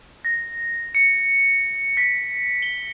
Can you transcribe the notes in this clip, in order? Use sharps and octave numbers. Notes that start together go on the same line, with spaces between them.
A#6
C#7
B6
G7